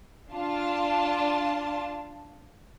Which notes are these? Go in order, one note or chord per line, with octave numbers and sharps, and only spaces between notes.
D4 F4 A5